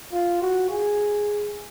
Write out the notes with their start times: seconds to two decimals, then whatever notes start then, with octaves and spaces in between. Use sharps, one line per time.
0.12 F4
0.42 F#4
0.70 G#4